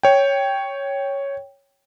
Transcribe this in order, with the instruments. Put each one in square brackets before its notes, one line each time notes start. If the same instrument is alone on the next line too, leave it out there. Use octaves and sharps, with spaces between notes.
[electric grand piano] C#5 G5